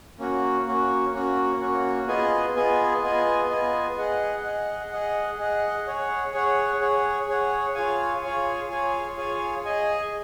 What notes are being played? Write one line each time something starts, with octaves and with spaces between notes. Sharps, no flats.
A#3 C#4 F#4
A#3 C#4 F#4
A#3 C#4 F#4
A#3 C#4 F#4
B3 F4 G#4 D#5 G#5
B3 F4 G#4 D#5 G#5
B3 F4 G#4 D#5 G#5
B3 F4 G#4 D#5 G#5
G#4 D#5 F#5
G#4 D#5 F#5
G#4 D#5 F#5
G#4 D#5 F#5
G#4 C#5 F#5
G#4 C#5 F#5
G#4 C#5 F#5
G#4 C#5 F#5
F4 G#4 C#5 F5 G#5
F4 G#4 C#5 F5 G#5
F4 G#4 C#5 F5 G#5
F4 G#4 C#5 F5 G#5
G#4 D#5 G#5